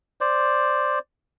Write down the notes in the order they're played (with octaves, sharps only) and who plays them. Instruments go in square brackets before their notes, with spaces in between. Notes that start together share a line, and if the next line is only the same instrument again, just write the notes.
[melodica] C5 D5